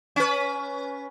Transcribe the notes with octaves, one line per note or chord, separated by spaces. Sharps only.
C#4 B4